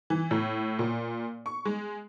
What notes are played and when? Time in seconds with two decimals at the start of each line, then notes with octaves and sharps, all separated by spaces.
0.10 E3
0.31 A2
0.79 A#2
1.46 C#6
1.65 G#3